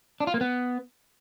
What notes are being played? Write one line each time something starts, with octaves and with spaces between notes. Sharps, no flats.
D4
F4
A#3
B3